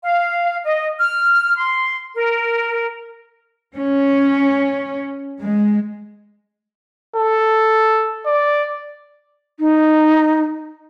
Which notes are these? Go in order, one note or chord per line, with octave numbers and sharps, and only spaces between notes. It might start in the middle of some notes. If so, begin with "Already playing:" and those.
F5
D#5
F6
C6
A#4
C#4
G#3
A4
D5
D#4